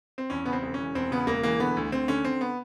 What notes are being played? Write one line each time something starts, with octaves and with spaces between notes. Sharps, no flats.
C4
E2 C#4
C#3 B3
C4
E1
E3 C#4
E2 C4
C#3 B3
E1 A#3
E3 A#3
D3 B3
D2
D2 C4
D3 C#4
D3 C4
B3